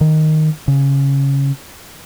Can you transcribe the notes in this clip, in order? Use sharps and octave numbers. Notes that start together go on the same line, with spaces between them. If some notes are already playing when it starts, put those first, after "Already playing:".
D#3
C#3